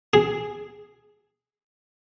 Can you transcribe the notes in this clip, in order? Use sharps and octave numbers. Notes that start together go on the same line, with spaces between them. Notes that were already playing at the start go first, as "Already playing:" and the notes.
G#4